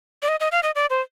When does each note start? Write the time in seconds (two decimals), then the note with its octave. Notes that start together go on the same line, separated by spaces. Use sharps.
0.23 D5
0.28 D#5
0.40 D#5
0.52 F5
0.63 D#5
0.75 D5
0.90 C5